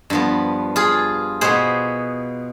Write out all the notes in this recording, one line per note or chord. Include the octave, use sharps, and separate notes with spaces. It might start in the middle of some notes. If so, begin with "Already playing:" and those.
G2 F3 B3
F4 G#4
B2 B3 G#4 C5